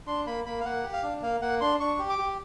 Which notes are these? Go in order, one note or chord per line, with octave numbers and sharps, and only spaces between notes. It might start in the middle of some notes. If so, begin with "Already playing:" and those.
D4 C6
A#3 B5
A#3 B5
F5
A#3 F#5
G4
F5
D4
A#3 F5
A#3 F#5
D4 C6
D4 C#6
G4
D6
G4